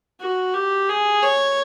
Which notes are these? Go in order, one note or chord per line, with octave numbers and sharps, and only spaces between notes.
F#4
G4
G#4
C#5